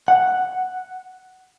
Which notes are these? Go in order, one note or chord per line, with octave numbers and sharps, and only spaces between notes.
F#5